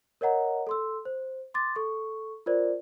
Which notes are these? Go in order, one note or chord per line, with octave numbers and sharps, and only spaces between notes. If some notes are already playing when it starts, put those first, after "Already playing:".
A#4 C#5 D#5 F#5 A#5
A4 C6 E6
C5
C6 D6 A6
A4 C#6
F4 A#4 C5 D5